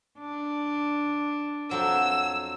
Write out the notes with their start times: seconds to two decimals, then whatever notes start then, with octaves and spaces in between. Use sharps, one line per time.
0.19 D4
1.71 F2 F#3 E6